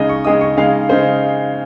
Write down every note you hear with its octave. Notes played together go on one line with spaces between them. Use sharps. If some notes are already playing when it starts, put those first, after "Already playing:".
Already playing: C#3 G#3 D#4 D#5
C#6
C#3 G#3 D#4 D#6
C#6
C#3 G#3 D#4 F5
C#3 G#3 D#4 C5